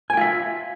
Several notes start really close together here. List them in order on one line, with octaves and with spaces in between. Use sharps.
G#5 G5 F4 E5